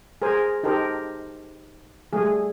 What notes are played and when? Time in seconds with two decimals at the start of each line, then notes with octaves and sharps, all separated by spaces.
0.22 G#4 A#4 C5 G#5
0.63 D#4 G4 A4 A#4 C5
2.13 G3 A3 G#4